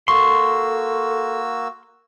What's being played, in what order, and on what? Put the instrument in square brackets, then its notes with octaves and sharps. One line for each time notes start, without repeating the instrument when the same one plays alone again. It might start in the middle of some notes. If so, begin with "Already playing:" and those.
[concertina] A#3 F#4 E6 [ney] A4 [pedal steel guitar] C6 [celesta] C#6